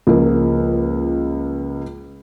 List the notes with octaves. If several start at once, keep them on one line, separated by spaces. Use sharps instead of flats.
C#2 F3 A#3